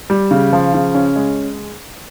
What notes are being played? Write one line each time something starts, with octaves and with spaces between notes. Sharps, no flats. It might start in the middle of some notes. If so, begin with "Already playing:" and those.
G3
C#3
F3
C#3
C#4
G#3